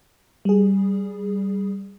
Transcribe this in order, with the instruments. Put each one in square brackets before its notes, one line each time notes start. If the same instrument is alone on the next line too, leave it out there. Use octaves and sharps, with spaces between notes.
[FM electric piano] G3 G#4